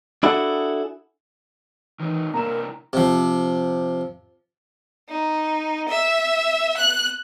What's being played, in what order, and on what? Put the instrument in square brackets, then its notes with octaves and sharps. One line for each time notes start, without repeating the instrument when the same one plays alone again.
[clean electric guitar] D4 E4 F#4 G#4 A4 F#5
[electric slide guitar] D#3 F#3 D#4 [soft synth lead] E3
[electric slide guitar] C3 D4 E4 [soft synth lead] A#3 [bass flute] A#4 [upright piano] A#5 E7
[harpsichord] C3 F3
[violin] D#4
E5
F#6